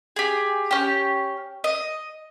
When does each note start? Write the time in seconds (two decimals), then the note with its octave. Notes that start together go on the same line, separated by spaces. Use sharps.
0.16 G4 G#4
0.71 C#4 G4
1.64 D#5